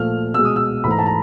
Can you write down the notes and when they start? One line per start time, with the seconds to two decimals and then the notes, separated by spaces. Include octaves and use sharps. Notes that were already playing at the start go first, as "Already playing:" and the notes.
Already playing: A#2 F3 A3 F6
0.34 B2 G#3 E6
0.45 D#6
0.56 E6
0.84 G#2 E3 A3 B5
0.91 A#5
0.99 A5
1.06 A#5